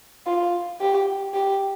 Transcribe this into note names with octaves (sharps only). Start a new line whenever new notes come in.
F4
G4
G4